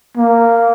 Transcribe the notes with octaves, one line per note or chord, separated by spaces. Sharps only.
A#3